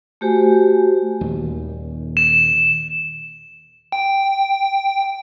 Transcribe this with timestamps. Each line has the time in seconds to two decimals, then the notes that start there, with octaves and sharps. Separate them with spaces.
0.21 A3 F#4 G4 C5 G#5
1.21 D#1 D#2
2.17 E7
3.92 G5